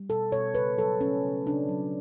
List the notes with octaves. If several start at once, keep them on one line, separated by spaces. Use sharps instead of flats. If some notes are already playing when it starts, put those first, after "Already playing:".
Already playing: G3
B2 A4
B2 C#5
C#3 B4
F#3 A4
A3 C#4
C#3
C#3 D4
F#3